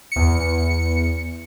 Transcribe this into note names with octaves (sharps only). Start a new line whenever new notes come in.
E2 C#7